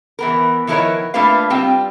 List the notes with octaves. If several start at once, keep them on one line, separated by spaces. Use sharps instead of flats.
E3 B3 A#4
D#3 F3 E4 A#4 B4 C#5
A3 A#3 D4 F4 B4 F5
G3 C4 F4 G5